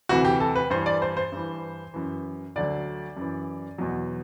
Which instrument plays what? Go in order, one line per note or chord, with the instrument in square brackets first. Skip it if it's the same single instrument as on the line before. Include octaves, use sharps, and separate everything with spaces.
[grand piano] D2 C3 E3 F#4
G4
A4
B4
G2 E3 C5
D5
C5
C5
G2 E3
F#2 E3
D2 D3 F#3 D5
F#2 E3
E2 B2 F#3